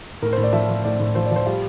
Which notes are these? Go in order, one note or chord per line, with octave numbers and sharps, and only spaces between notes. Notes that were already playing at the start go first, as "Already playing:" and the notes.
A2 A#4
C5
A2
D5
F3 E5
F3
A2 D5
A2
F3 C5
D5
F3 C5
G3 F4